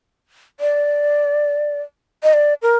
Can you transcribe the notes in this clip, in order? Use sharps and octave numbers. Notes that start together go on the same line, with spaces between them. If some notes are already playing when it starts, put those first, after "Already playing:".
D5
D#5
D5
A#4